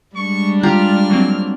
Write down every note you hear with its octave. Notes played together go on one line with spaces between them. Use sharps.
G3 G#3 D4 C#6
F4 G4 A#5 F6
F#3 A#3 C4